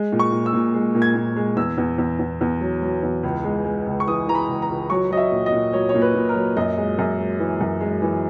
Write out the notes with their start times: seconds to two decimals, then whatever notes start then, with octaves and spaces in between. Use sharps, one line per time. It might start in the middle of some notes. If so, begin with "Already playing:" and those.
Already playing: G#3
0.12 A#2
0.19 C#6
0.32 A#2
0.46 E6
0.53 A#2
0.74 G#3
0.95 A#2
1.02 G#6
1.15 A#2
1.36 G#3
1.57 E2 E6
1.78 E2
1.98 E2
2.19 E2
2.41 E2
2.61 F#3
2.82 F#3
3.03 E2
3.23 C#2
3.44 G#3
3.65 G#3
3.87 C#2
4.00 C#6
4.08 E3 D#6
4.27 E3 A#5
4.35 B5
4.48 C#2
4.62 A#5
4.70 C#2
4.90 F#3 C#6
5.10 F#3 D#5
5.17 E5
5.32 A#2
5.46 D#5
5.53 A#2
5.73 F#3 C#5
5.89 C#5
5.95 A#2
6.02 B4
6.15 A#2
6.29 A#4
6.35 F#3
6.57 F#2 D#5
6.78 G#3
6.99 F#2
7.19 G#3
7.40 E3
7.61 F#2
7.81 G#3
8.02 E3